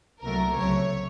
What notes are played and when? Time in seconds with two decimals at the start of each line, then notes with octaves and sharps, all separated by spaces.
0.22 C2 A#2 F#3 A3 A#4
0.56 C#2 C3 F#3 A3 C#5